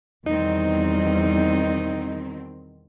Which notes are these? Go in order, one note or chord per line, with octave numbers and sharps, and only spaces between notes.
E2 B2 D#3 G3 C4 D#4